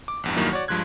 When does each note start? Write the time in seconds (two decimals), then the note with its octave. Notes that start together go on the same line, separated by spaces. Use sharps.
0.08 D6
0.24 A#1 E2 G2
0.36 E2 G2 D#3 F#3 A#3 E4
0.51 F#4 C#5 D5
0.68 G2 F3 G#3 C6 F#6 G#6